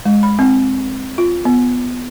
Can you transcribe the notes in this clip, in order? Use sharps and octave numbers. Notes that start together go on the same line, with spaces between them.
G#3
B5
C4
F4
B3